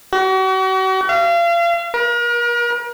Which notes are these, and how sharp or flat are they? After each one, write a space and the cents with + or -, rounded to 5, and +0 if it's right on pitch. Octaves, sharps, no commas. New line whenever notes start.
F#4 +40
F5 -35
A#4 +40